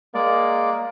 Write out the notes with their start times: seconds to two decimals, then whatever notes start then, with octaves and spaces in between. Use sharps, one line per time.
0.15 G#3 A#3 D5